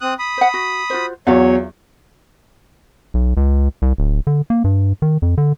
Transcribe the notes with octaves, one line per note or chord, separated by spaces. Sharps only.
C4 D#6 F#6
B5 D#6
C5 F#5
F#4
F4 F#4 C5
E2 F#3 F4 C#5 E5 F5
B1
C#2
C2
D1
D3
A#3
G2
D#3
F2
D3